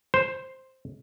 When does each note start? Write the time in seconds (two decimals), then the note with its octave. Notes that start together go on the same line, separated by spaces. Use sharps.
0.14 C5